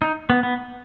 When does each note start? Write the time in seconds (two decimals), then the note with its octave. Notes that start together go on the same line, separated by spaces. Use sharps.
0.02 D#4
0.30 B3
0.43 B3